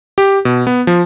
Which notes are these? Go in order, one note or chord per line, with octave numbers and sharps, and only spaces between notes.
G4
B2
B3
F3